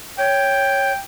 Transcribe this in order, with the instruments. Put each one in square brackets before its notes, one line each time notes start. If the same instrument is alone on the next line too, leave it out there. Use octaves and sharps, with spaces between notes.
[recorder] C#5 [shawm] G5